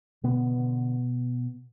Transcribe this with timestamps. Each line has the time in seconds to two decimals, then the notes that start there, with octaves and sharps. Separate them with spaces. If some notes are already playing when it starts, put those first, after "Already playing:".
0.24 B2 D3 B3
0.58 D3